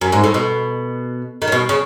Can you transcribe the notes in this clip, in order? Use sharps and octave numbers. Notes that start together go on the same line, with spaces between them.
F#2
G#2
A2
B2
D#3
C#3
B2
C#3